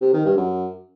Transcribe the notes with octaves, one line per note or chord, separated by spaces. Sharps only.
C3
D#3
G2
F#2